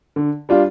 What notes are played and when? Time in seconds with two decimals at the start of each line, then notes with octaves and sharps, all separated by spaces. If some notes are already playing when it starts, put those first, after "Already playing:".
0.16 D3
0.49 G3 D4 F4